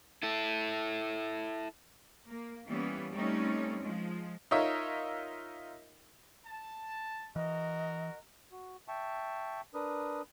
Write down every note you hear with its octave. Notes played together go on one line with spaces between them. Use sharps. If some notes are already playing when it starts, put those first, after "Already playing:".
E4 A4
A#3
E3 G3 A#3 B3 C#4
G3 A3 C4 C#4 D#4
F3 G#3
D#4 F4 A#4 C#5 E5
A5
E3 F#4 A#4 D#5
F#4
E5 G5 A5 C#6
D4 A#4 B4 D#6